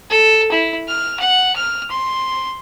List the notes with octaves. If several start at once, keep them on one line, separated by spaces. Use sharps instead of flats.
A4
E4
F6
F#5
F6
C6